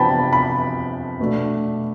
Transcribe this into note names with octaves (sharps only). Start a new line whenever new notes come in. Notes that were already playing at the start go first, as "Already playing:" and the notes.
Already playing: C3 F3 B3 D4 G5 A5 B5
B5
B2 A3 D4